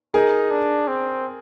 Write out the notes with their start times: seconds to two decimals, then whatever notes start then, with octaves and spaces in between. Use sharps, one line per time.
0.14 D#4 G#4 A#4
0.51 D4
0.88 C4